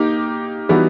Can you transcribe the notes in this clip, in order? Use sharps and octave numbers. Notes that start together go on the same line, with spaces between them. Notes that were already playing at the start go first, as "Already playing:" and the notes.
Already playing: A#3 D#4 G4
E3 G3 B3 D#4 F#4